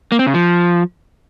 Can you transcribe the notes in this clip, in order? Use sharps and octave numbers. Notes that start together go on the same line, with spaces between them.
A#3
C4
C#3
F3